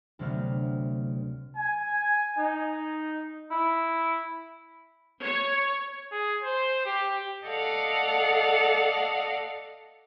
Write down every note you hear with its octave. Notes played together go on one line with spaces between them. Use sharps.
D2 C3 F#3 A3 B3 F6
G#5
D#4
E4
C#5
G#4
C5
G4
A4 D5 D#5 F5 F#5